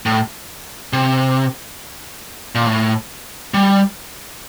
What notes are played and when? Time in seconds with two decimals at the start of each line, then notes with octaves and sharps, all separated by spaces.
0.06 A2
0.93 C3
2.55 A#2
2.66 A2
3.54 G3